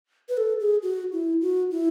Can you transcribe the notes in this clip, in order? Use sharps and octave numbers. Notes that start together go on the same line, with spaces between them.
B4
A4
G#4
F#4
E4
F#4
E4